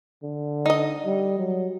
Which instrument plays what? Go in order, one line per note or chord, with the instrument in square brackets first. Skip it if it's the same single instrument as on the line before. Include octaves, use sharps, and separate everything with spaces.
[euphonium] D3
[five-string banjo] D#4 D#5
[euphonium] G3
F#3